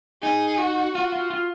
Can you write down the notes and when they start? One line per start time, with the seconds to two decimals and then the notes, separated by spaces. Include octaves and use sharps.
0.23 D#4 G#4
0.58 F#4
0.95 F4 F#4
1.12 F4
1.30 F4